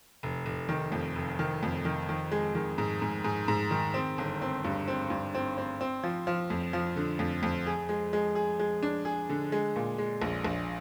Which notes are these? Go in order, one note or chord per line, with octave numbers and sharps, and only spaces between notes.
F1
F1
D#3
F2
F1
D#3
F2
D#3
D#3
G#3
D#3
G#2
G#2
G#2
G#2
D#3
C4
G1
C4
G2
C4
G2
C4
C4
C4
F3
F3
F2
F3
D3
F2
F2
G#4
G#3
G#3
G#4
G#3
D4
G#4
D3
G#3
A#2
G#3
A#1
A#1